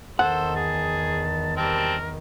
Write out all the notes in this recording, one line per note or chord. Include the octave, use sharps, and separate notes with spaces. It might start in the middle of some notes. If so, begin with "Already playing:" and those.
E2 D#3 A4 C5 F#5
G#4 A5
G3 C4 A#4 A5